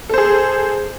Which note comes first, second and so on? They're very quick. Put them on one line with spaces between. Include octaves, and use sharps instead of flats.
A4 C5 G#4